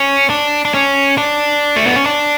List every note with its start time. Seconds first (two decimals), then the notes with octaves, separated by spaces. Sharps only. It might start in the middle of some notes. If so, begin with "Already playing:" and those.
Already playing: C#4
0.30 D4
0.65 D4
0.74 C#4
1.18 D4
1.76 A3
1.87 B3
1.96 C#4
2.06 D4